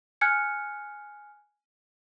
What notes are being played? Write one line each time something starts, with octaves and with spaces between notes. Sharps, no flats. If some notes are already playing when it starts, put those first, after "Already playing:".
G#5 F6 F#6 G#6 C#7